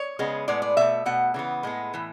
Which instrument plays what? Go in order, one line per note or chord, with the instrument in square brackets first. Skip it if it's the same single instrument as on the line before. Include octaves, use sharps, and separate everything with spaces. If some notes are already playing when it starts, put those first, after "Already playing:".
Already playing: [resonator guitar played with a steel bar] C#5
C#3 G#3 B3
A2 G#3 B3 D5
D5
B2 A3 E5
B2 A3 F#5
C#3 E3 B3
A2 G#3 B3
A2 E3